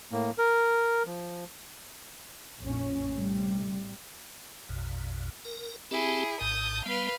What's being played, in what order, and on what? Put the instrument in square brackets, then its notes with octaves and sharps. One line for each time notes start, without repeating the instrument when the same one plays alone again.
[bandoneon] A2 A#3
A#4
F3
[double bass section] A#1 F2 C#4
A2 C3 G3
[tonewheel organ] A#1 F2 B2
A#4
[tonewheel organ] C4 G4 A5 [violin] E4 G#4
[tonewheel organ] A#1 A2 A5 [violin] D#6 G6
[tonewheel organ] G3 B3 [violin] B4 F5